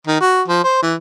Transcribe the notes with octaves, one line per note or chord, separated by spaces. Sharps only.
D#3
F#4
F3
C5
E3